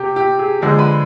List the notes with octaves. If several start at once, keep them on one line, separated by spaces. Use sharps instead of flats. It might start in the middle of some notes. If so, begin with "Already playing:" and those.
Already playing: C3 G4
G4
G#4
D3 F3 G#3 G#4
B4